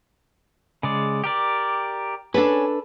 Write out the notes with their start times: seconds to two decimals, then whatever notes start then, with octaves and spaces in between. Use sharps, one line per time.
0.83 C#3 G#3 D5
1.24 G4 A#4 D5
2.34 C#4 D4 A4 B4